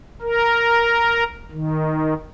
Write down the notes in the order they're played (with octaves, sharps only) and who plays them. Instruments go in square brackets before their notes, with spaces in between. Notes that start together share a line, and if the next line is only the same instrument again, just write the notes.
[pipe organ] A#4
D#3